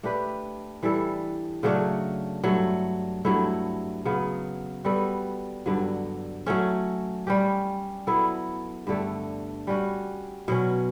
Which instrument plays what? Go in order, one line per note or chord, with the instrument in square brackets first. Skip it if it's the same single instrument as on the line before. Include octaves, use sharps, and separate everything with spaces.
[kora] A3 D4 G4 B4
E3 G3 D4 A4
C#3 F#3 A3 D4
G2 F#3 A3
G2 F#3 A3 E4
C#3 F#3 B3
G3 B3 F#4 A4
G2 D3 F#3
F#3 A3 C#4
G3 C#4 G4
F#3 B3 E4 A4
G2 D3 A3
G3 C#4 F#4
B2 F#3 C#4